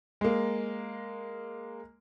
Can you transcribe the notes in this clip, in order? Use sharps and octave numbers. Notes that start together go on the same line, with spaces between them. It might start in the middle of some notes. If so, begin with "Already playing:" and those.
G#3 A#3